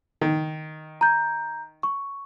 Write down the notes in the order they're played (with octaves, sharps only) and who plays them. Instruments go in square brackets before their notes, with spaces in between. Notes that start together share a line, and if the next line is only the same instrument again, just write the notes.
[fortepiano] D#3
[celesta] A#5 G6
C#6